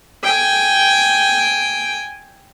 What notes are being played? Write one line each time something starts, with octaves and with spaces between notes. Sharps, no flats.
G5 G#5